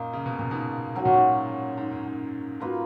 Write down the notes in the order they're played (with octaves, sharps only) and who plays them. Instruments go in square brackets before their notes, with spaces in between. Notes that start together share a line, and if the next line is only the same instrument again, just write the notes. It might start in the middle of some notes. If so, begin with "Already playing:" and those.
Already playing: [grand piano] F#2 A#2 [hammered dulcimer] A#3 D#4
[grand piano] C#3
B2
A#2
G#2 B2
[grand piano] G#2 [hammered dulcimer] F#3 C#4 F#4
[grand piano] A#2
G#2
G#2
F#2
G#2
[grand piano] G#2 [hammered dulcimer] A#3 F4 B4